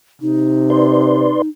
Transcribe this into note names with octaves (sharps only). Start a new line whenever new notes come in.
C3 D#4
B4 D5 C6